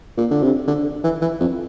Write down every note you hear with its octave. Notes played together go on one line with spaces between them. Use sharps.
A#2
D3
C3
D3
E3
E3
F2